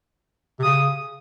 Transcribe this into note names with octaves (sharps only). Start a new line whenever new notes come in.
C3
C#3 D#6